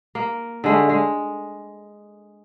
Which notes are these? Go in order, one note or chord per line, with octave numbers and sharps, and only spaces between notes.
A#3
D3 G#3 A3
G#3